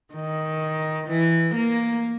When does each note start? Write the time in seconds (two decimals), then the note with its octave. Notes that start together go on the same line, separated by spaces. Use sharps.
0.14 D#3
1.08 E3
1.55 A#3